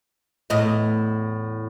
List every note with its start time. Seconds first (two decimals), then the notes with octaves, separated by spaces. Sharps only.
0.50 E2 A2 D#5